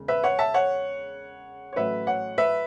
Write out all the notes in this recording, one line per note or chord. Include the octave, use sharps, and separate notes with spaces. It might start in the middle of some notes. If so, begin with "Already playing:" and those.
Already playing: E1 C#3
B4 E5
C#5 F#5
E5 A5
C#5 F#5
C#5
A1 A2 F#3 B4 E5
C#5 F#5
B4 E5